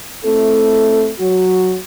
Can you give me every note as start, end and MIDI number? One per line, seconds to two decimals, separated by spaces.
0.25 1.11 57
0.25 1.11 60
0.25 1.11 64
0.25 1.11 69
1.19 1.77 54
1.19 1.77 66